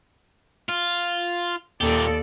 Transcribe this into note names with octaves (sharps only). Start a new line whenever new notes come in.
F4
D#2 A#2 G4 A4 D5